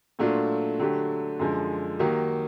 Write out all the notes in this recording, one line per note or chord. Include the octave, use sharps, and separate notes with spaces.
A#2 F#3 A3 D4 F4
D3 F#3 A3 D4 G4
F#2 D3 F3 G#3
D#3 F#3 A#3 D#4 G4